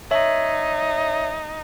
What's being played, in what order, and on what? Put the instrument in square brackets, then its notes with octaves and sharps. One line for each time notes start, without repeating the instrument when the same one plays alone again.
[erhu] D#4 [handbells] C#5 E5